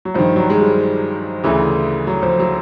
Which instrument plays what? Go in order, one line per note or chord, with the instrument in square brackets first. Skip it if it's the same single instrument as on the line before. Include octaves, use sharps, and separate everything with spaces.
[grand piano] F#3
G2 D#3 F3
F#3
G#3
G3
D2 C#3 E3
F#3
F3
F#3